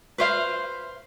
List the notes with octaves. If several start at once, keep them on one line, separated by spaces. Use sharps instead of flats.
B4 C5 F5